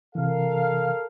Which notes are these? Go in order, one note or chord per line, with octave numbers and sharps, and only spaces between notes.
C3 E3 A4 A#4 F5